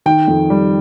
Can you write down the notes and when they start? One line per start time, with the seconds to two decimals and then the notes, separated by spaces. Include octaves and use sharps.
0.06 D#3 G5
0.28 F2
0.50 G3